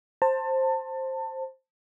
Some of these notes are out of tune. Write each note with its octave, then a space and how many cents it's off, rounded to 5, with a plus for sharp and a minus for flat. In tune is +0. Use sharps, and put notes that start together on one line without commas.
C5 +10 A5 +25